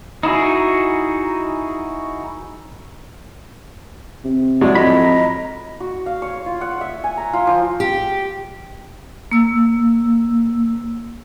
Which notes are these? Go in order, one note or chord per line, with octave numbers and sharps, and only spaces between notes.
D#4 E4 F#4 G#4
C3
A2 F#3 G#3 D5
F2 D#5 A#5 B5
F#4
F5
C#5
F4
F#5
E5
G#5
A#5
F4
F3
G4
A#3 E6